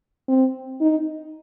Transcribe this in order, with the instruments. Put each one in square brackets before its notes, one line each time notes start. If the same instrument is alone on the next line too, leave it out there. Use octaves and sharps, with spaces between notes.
[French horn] C4
D#4